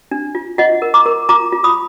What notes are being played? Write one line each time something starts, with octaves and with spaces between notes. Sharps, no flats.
D4
F4
F4 D#5 F#5
A#4
A#5 D6
A#4
F4 A#5 D6
F4
B5 D#6